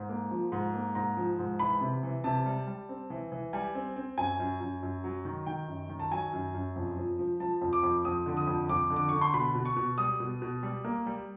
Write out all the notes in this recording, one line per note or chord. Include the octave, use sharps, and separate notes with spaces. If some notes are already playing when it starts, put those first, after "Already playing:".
Already playing: G#2
A#3
F3
G#2
A#3
G#2 A#5
F3
G#2
E3 B5
C3
E3
C3 A5
G3
G3
C4
E3
E3
G3 G#5
C4
C4
F#2 G#5
F#2
F#2
F#2
F#3
D#3
D#3 G5
F#2
D#3
A5
F#3 G#5
F#2
F#2
F2
F3
F3
F3 A5
F2
D6
F2
F2 D#6
D3
D#6
F2
F2 D6
D3
D6
D3 C#6
C6
B2 B5
B2
C#6
B2
G3 D#6
B2
B2
G3
A#3
G3